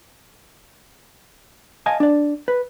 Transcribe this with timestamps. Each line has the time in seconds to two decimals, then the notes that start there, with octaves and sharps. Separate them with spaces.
1.86 D#5 F5 G#5 A5
2.00 D4 D5
2.48 B4